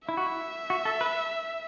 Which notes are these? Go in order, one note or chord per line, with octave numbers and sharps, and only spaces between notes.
E4 E5
F#4
E4
F#4
A4
B4